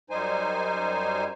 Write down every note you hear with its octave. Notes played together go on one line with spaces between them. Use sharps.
F#2 G3 D#4 C5 G#5